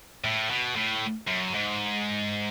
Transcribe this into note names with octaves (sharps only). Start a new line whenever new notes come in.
A2
B2
A2
F#2
G#2